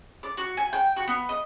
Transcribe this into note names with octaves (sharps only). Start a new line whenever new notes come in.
D5
F#4
G#5
G5
F#4
B3
D#5